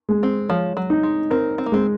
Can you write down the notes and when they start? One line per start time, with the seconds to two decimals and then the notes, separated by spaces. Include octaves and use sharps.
0.09 G#3
0.23 C4
0.49 F3 C#5
0.77 F#3
0.90 D#4
1.03 G#3
1.30 C4 A#4
1.58 C4
1.66 A#3
1.72 G#3 C4